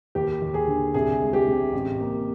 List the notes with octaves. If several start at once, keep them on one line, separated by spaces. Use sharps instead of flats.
D#2 G4
D#2
G#4
D3
C2 G#4
G#3
G4
C3
A1
A#3